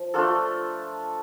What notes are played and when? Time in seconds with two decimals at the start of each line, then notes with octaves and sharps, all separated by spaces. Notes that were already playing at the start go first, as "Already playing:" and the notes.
Already playing: F3
0.14 A3 D4 F4 A4